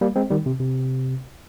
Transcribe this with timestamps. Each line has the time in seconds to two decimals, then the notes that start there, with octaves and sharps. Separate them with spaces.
0.01 G3 A#3
0.16 G#3 C4
0.30 D#3 G3
0.46 C3
0.60 C3